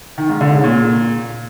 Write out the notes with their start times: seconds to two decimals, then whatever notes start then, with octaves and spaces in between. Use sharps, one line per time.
0.18 D#3
0.29 G#2
0.41 D3
0.52 C#3
0.64 A#2